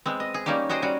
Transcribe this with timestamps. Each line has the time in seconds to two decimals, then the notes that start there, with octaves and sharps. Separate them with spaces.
0.06 G#3 B3 C4
0.20 D#5
0.34 G#4
0.46 G3 A#3 C#4 D#4 G4
0.69 F#4 G#4 C5 D#5 G5
0.82 G3 C#4 F#4